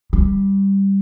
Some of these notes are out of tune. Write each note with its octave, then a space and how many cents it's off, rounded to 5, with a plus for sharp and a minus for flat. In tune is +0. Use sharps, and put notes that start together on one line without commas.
G3 +5